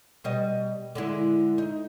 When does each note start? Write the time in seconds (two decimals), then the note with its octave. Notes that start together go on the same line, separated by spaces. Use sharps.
0.24 B2 G3 D#5
0.95 D3 G#3 E4
1.58 D#4